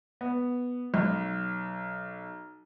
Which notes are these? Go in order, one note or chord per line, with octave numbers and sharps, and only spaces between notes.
B3
B1